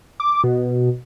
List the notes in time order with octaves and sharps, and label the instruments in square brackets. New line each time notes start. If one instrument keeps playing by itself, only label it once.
[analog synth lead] D6
B2